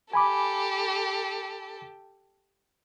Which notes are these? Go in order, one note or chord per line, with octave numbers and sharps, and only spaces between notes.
G4 A4 G#5 B5 D6